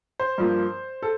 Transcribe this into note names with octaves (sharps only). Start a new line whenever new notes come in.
C5
G2 F3 A#3
A4